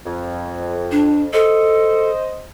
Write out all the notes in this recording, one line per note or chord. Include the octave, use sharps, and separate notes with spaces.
F2
D4
A4 C5 D#5